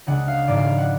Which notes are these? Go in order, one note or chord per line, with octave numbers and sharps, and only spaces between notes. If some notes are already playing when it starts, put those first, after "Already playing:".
C#2 C#3 G#3 D4 F#5
F5
G#1 G#2 F3 G#3 D5
F5
F#5